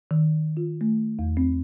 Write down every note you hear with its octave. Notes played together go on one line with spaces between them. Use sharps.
D#3
F4
A3
E2
C4